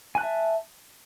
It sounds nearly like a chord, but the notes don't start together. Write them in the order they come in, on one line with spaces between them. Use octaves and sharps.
G#5 F#6 A5 E5